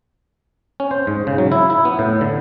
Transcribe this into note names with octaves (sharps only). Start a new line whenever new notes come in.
C#4
C5
G#2
C#3
F#3
E4
E4
B3
A2
D3